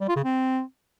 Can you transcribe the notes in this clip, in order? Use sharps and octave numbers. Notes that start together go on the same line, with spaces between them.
G3
F4
C#3
C4